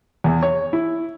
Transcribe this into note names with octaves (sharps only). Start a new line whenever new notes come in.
E2
C#5
E4